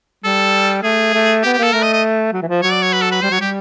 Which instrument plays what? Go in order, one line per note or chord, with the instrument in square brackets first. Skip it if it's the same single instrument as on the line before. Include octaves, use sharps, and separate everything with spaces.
[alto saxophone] G3 [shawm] A4
[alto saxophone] A3 [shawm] G#4
[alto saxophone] A3
[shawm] G4
[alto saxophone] B3
[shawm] G4
[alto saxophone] A#3 [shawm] A4
[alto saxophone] A3 [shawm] A#4
[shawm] D#5
D#5
[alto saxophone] F#3
E3
F3
[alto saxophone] F#3 [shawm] C#5
[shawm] D5
C#5
B4
A4
B4
[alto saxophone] G3 [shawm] C5
[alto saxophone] F#3 [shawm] C#5
[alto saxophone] G3 [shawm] G4